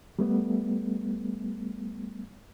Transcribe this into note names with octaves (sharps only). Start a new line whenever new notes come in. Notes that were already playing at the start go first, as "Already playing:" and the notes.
G3 A3 B3